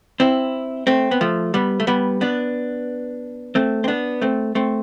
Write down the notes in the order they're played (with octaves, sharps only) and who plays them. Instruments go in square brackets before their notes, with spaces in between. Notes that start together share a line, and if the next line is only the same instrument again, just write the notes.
[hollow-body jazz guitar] C4 E4
A3 C4
B3
F3 A3
G3 B3
A3
G3 B3
B3 D4
A3 C4
C4
B3 D4
A3 C4
A3 C4